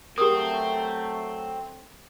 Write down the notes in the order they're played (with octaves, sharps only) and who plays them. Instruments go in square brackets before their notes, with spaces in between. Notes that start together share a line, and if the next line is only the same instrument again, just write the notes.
[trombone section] F#3 A3 [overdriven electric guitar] C4 [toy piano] G4 D#6 [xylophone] A#4